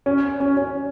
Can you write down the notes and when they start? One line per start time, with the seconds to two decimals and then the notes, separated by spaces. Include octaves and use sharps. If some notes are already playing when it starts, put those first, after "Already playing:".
0.06 C#4
0.40 C#4
0.57 C#4